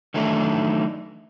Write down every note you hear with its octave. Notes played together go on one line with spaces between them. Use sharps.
D#3 E3 F#3 A3 D4 D#4